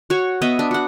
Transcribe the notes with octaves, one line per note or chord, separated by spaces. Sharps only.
F#4 C#5
B3 D#5 E5
D4
F#4 F#5